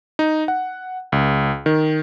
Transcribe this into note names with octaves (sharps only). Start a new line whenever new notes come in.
D#4
F#5
C#2
D#3